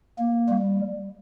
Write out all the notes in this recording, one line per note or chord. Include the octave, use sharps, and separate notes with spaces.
A#3
G3